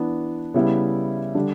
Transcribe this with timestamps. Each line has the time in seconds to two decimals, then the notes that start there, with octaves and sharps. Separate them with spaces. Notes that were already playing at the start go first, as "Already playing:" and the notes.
Already playing: E3 B3 D4
0.54 C#3 G3 B3 E4
1.35 D3 G3 D4